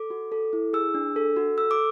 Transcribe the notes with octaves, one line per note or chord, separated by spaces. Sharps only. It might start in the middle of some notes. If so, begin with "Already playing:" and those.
Already playing: A4 D6
F#4
A4
E4
G#4 E6
D4
A4
F#4
A4 E6
D6